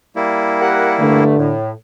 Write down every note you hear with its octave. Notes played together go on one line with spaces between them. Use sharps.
G3 A#3 E4
G4 A#4 F#5
G2 D3 A3
A2